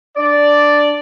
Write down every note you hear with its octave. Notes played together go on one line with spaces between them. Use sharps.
D4 D5